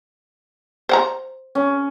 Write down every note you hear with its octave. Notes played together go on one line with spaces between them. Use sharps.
C5 F#5 A#5
C#4